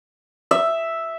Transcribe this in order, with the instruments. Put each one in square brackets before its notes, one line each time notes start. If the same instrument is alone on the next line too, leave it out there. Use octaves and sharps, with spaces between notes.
[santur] E5